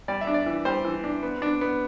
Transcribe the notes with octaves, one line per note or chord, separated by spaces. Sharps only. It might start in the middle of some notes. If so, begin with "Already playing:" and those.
G3 D5
E5
D4
D5
E3
G3 C5
E3
D4
B3
D4
B3